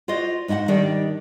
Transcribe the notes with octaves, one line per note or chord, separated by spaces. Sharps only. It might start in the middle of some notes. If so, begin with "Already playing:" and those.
F4 F#4 C5 D5 D#5
G#2 D#4 E4 F#4 F#5
D#3 G3 D4 D#4 G4 D5